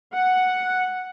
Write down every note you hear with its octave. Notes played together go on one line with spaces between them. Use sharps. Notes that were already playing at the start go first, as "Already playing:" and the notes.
F#5